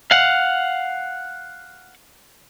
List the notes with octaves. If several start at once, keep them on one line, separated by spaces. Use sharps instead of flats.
F5 F#5